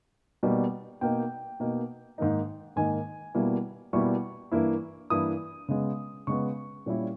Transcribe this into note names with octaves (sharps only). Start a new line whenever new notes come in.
B2 G3 A#3 D#4
B2 A#3 D#4 G5
B2 A#3 D#4
G#2 D#3 A#3 D#4
G#2 D#3 A#3 D#4 G#5
B2 G3 A#3 E4
B2 G3 A#3 E4 C#6
G2 E3 A#3 E4
G2 E3 A#3 E4 D#6
C#3 G#3 B3
C#3 G#3 B3 C#6
A#2 G3 C#4 E4